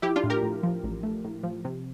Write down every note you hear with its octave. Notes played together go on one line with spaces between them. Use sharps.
F3 E4 G4
D4 F4
A2
G4 A#4
A2
F3
A1
A3
A2
F3
C3